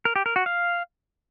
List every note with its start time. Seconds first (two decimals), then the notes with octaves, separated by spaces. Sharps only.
0.05 A#4
0.16 G4
0.26 A#4
0.36 F#4
0.46 F5